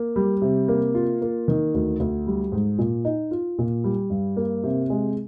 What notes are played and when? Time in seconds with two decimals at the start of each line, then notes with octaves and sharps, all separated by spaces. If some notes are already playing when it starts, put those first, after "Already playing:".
Already playing: A#3
0.16 G3
0.42 C3
0.68 A#3
0.95 F4
1.22 A#3
1.48 D#3
1.74 D2
2.00 D2
2.27 G3
2.52 G#2
2.79 A#2
3.05 D#4
3.31 F4
3.58 A#2
3.84 G3
4.10 G2
4.37 A#3
4.64 C3
4.90 G#3